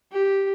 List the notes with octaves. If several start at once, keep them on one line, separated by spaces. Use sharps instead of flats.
G4